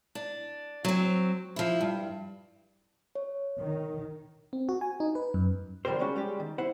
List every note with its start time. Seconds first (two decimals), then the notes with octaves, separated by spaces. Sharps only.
0.15 D4
0.85 F#3 C4
1.56 F3 E4
1.81 G2
3.15 C#5
3.61 D#3
4.53 C4
4.69 F#4
4.81 G#5
5.00 D#4
5.15 B4
5.34 F#2
5.85 D3 F3 G3 A#3 A#4 C5
5.99 G3 G#3 C#4 F#4
6.16 G3 G#3 G4
6.40 D#3
6.58 E4 C5 F#5